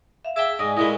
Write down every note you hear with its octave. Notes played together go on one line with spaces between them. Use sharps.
E5 F5
G#4 E5 G5 A5 D6
G#2 D5 D#5 G#5
A#2 G#3 A3 E4 D#5